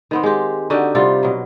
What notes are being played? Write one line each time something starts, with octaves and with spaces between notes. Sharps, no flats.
D#3 B3 C4
G#3 G4
D3 D#4 F#4 G4
C3 G3 F4
B2 F#3